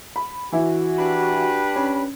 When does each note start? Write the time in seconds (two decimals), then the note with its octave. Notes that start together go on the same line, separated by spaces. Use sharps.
0.16 B5
0.52 E3 E4 F#4
0.98 D4 G4 B4
1.76 C#4